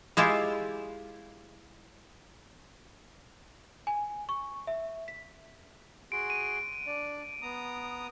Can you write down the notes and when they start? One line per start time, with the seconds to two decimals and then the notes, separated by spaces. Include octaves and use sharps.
0.17 G#3 E4 F4 G4
3.87 G#5
4.29 C#6
4.67 E5
5.08 B6
6.12 F#4 G#4 C6 D7
6.30 D#7
6.87 D4 D5
7.42 B3 A#5 D#6